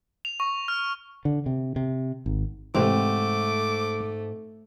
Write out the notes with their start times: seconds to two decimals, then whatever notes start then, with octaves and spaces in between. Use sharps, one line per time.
0.25 F7
0.40 C#6
0.68 F6
1.25 D3
1.46 C3
1.76 C3
2.26 G#1
2.75 G#2 C3 E3 A3 C4 D6